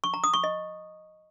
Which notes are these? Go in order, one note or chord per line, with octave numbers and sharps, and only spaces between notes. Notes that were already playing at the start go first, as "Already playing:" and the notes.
C#6
A#5
D#6
C#6
D#5